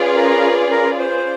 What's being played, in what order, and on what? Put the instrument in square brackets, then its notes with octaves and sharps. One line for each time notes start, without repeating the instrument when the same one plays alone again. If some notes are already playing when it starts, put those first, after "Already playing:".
Already playing: [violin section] C#4 F4 G#4 B4 D5
[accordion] A#4
A#4
C5